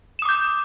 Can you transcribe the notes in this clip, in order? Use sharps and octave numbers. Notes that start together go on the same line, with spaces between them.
D6 D#6 G6 E7